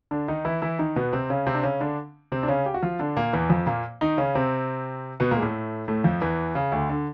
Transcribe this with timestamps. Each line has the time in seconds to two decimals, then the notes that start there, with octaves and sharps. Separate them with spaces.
0.11 D3 D4
0.28 D#3 D#4
0.45 E3 E4
0.62 E3 E4
0.79 D#3 D#4
0.96 B2 B3
1.13 C3 C4
1.30 C#3 C#4
1.47 C3 C4
1.55 D4
1.63 C#3 C#4
1.80 D3 D4
2.32 C3 C4
2.43 D4
2.48 C#3 C#4
2.66 G4
2.74 F#4
2.82 F3 F4
2.99 D3 D4
3.17 A#2 A#3
3.33 E2 E3
3.50 F2 F3
3.66 A#2 A#3
4.01 D#3 D#4
4.18 C#3 C#4
4.35 C3 C4
5.20 B2 B3
5.31 A#2 A#3
5.37 G#3
5.42 A2 A3
5.88 A2 A3
6.04 F2 F3
6.21 E2 E3
6.55 C#3
6.72 D2 D3
6.89 D3